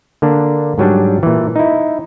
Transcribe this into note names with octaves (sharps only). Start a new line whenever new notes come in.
D3 A#3 D4
G#2 F#3 G3 D4
A#2 E3
D#4 E4